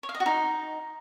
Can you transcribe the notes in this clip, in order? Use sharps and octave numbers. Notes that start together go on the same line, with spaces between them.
C#5
F5
D#5
F#4
D#4